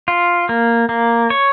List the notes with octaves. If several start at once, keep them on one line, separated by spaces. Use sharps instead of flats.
F4
A#3
A#3
C#5